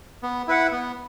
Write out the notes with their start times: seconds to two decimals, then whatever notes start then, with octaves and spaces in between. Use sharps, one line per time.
0.23 B3
0.48 E4 B4 F#5
0.72 B3